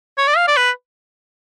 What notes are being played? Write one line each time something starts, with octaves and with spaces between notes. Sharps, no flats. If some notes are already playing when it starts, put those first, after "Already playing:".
C#5
D5
F5
D5
B4